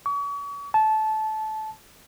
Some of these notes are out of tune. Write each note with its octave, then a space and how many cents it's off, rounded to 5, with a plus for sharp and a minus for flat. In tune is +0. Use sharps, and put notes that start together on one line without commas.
C#6 +40
A5 -20